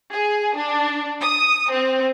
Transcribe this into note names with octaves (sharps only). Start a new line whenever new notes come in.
G#4
D4
D#6
C4